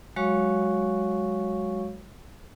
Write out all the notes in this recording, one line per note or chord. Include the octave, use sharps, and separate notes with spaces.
F#3 G#3 F#4 C#5 F5 C#6